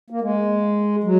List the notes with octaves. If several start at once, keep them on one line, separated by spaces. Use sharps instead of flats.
A#3
G#3
F#3